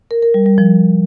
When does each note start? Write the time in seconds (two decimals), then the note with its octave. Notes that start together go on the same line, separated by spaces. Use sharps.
0.11 A#4
0.22 A#4
0.34 G3
0.46 G3
0.58 F3